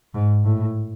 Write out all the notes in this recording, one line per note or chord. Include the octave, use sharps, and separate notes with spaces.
G#2
A2